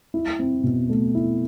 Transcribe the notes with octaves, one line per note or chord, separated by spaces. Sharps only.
E4
C4
B2
A3
E4